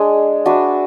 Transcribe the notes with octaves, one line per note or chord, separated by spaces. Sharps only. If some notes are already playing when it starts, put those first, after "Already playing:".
Already playing: G#3 D4 G#4
D4 F#4 B4 E5